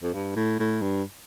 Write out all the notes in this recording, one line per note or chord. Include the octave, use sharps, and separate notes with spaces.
F2
G2
A2
A2
G2